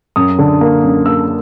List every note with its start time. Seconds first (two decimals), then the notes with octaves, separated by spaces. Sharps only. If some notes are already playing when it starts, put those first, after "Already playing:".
0.16 F#2 D#6
0.39 D3
0.61 A#3
0.83 F#2
1.06 A#3 E6